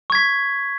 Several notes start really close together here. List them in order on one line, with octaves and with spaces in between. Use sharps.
C#6 G#6 B6